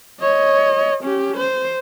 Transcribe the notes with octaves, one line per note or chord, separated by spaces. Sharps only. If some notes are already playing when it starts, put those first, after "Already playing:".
C#5 D#5
C#4 G4
C5